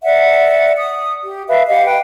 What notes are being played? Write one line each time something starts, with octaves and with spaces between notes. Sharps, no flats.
D5 E5 F#5
D#6
G4
B4 E5 F5
G4 D#5 F5 F#5
B4 G5